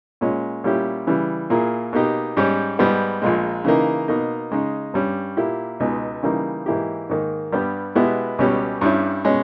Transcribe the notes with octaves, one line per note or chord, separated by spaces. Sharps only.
A#2 G#3 C#4
A#2 G3 C#4 E4 G4
C#3 E3 G3
A#2 A#3 E4 G#4
B2 A#3 D#4 G4
G#2 G3 C#4 G4
G#2 G3 B3
A#1 A#2 G#3
C#3 E3 A#3 D#4
B2 A#3 D#4
C#3 G#3 D#4
G2 G3 C#4
A#2 A#3 E4 G4
C#2 B2 G#3 D#4
C#3 E3 G3 A#3 D#4
G#2 E3 A#3 E4 G4
G#2 D#3 A#3
G2 G3 B3 G4
B2 G#3 B3 E4 G4
C#2 B2 G3 C#4 G4
G2 G3 C#4 E4
B2 G#3 C#4